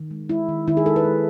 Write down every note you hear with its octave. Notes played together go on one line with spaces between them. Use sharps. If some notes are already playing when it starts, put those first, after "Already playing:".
Already playing: D#3
G#3
G#3 E4
D#3
D#3 E4
G#4
G#3 A4
B4
G#3